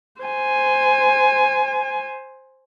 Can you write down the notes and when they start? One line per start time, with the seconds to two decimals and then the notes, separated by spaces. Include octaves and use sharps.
0.22 C5 G#5